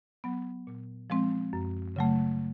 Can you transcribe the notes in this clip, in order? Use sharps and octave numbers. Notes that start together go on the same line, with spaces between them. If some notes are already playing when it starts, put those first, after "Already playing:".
F#3 B3
A#2
F3 G#3 C4
F#2
C#3 F#3 A3